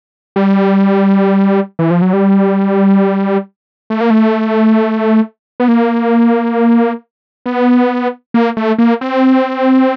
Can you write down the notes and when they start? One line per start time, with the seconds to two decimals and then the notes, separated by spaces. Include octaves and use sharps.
0.36 G3
1.79 E3
1.91 F3
2.02 F#3
2.13 G3
3.90 A3
4.01 A#3
4.10 A3
5.60 B3
5.68 A#3
7.46 B3
8.34 A#3
8.57 A3
8.78 A#3
9.01 C4